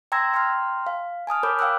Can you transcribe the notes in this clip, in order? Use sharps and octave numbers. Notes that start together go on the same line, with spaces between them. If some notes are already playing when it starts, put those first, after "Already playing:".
G5 A#5 C6 E6 G#6 A#6
G5 A#5 C6 F6
F5
G#5 A5 D#6 F6
A#4 C#5 B5 D6 F6 G6
F5 G5 D6 E6 F#6